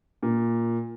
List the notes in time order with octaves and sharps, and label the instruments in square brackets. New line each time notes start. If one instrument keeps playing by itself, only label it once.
[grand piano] A#2